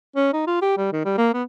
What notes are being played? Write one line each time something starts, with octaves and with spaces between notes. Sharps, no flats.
C#4
D#4
F4
G4
G3
D#3
G3
A#3
B3